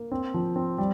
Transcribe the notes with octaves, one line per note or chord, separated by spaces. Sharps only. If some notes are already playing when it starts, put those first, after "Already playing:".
Already playing: A#3
C4
F3
C4
G3